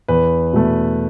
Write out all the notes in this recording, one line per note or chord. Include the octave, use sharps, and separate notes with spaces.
E2 B4
B2 A3